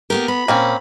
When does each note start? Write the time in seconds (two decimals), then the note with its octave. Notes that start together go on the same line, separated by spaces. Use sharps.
0.10 A#3 B3 G4 A#4
0.28 B3 B5
0.48 A#2 A#3 C4 C#4